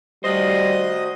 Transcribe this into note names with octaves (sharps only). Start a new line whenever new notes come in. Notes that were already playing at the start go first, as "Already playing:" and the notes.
G3 F#4 C5 D#5